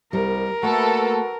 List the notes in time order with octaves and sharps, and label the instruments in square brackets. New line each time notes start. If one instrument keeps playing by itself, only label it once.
[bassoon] C2 [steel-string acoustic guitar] G3 [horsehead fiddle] A#4
[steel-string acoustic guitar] A3 A#3 [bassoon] F#4 [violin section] A4 B4